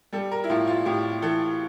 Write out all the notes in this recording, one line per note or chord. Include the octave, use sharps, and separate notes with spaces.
G3 A4
A#4
E4
A2 F4
F4
A2 G4
E3 A4